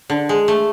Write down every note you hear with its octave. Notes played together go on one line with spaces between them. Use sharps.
D3
G#3
A3